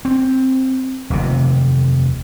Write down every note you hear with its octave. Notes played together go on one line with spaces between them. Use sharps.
C4
F1 D#2 C3